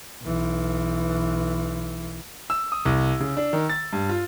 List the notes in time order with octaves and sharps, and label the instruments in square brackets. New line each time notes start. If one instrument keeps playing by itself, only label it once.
[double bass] B1 E3
[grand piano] E6
D#6
C2
C#3
D4
D#3
A6
G2
F4